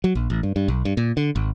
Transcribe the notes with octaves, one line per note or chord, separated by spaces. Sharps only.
F#3
A#1
A1
G2
G2
B1
G2
A#2
D3
G#1